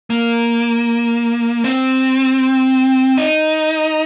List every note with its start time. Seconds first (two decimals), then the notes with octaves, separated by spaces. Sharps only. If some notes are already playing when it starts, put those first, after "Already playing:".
0.10 A#3
1.64 C4
3.18 D#4